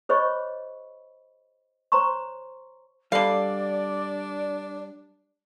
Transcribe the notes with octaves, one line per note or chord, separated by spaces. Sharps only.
G#4 C5 C#5 D#5 B5 C#6
C5 C#5 A#5 C6 C#6
D3 G3 D4 A4 D5 F5 B5